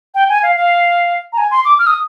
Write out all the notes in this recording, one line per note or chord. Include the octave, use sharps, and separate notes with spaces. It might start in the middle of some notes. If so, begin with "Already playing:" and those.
G5
G#5
F5
F5
A#5
G#5
C6
D6
F6
D#6